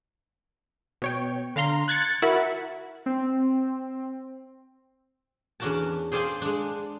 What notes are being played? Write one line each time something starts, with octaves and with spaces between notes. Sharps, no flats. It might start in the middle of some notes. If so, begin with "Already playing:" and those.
B2 C#5 G5
D3 F5 A#5 C6
F#6 G#6 A6 C#7
E4 F#4 A#4 E5 F#5 B5
C4
E2 C#4 D4 F#4 A#4 A5
G#4 C5 D5 F5 G5 G#5
G#3 D4